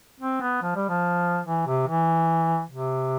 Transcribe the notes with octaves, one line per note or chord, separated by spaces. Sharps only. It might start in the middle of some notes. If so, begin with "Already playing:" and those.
C4
B3
F3
G3
F3
E3
C3
E3
C3